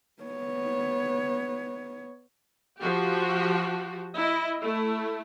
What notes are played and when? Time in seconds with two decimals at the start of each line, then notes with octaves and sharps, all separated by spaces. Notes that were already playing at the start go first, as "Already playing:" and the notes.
0.23 B3 C#5
2.81 F3 F#4 G4
4.15 E4 D#5
4.59 A3 E4